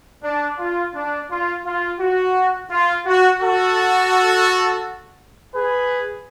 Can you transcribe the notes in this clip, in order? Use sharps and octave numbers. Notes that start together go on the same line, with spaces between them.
D4
F4
D4
F4
F4
F#4
F4
F#4
F#4 A4
G#4 B4